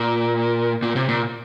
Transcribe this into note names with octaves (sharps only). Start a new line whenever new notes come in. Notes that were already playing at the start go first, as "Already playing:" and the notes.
Already playing: A#2
A#2
C3
A#2